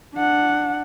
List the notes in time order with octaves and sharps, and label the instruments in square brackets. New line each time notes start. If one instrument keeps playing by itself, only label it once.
[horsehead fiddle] D4 F#5